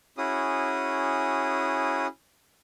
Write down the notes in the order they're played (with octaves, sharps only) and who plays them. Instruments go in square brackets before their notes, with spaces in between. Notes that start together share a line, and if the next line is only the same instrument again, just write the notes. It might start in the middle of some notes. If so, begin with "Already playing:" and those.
[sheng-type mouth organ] C#4 E4 F#4 G#4 D#6